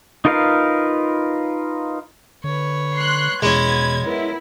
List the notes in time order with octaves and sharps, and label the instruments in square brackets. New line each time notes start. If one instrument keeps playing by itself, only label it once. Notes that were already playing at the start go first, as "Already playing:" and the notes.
[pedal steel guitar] D#4 F4 A#4 B4 F5
[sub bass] D3 [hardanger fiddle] B4 C#5
[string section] C6 F#6
[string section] E2 G#6 [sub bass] B2 [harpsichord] G#3 C#4 [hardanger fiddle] B5
[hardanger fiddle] B3 A#4 [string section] E4